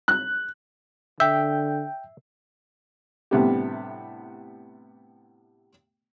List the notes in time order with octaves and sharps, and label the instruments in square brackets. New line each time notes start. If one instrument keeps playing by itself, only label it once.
[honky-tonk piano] F#6
[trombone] D3 [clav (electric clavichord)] E5 [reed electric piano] G5 G6
[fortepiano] A2 C3 G3 B3 D4 G4